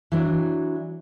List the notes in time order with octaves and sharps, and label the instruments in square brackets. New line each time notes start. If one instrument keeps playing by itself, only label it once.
[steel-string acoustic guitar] E3 F#3 D4